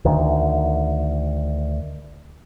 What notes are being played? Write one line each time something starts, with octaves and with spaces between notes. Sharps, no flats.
D2 D#3